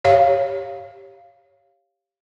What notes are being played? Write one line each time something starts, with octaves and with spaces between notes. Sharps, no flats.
G4 C#5 F5